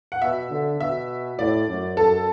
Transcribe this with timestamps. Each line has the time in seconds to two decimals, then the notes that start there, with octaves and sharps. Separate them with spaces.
0.12 F#5
0.22 B2 E5
0.51 D3
0.80 B2 E5
1.39 A2 D5
1.68 F#2
1.97 F#2 A4